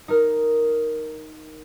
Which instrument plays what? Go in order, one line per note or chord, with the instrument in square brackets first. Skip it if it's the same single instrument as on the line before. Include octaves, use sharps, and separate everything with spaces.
[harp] D#4 A#4